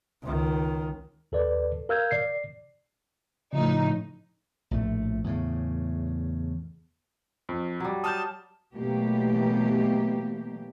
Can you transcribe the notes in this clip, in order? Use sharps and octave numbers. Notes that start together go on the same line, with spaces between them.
C#2 D#3
D#2 A4 B4 D5
A#4 F5 E6 F6 G6 G#6
D5 C7
A2 C#3 F3 A3 D#4
A#1 A2 A3
E2 A2 C#3
F2
F#3 G3
A5 D#6 F6 G6
B2 E3 F#3 A3 A#3 G4